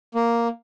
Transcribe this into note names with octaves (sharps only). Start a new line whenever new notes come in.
A#3